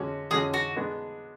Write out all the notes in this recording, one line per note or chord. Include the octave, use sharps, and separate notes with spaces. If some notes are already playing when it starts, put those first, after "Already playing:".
Already playing: D3 G#3 C#4 F#4
D3 G#3 C#4 F#4 G#4
F#4
G#3 B3 D4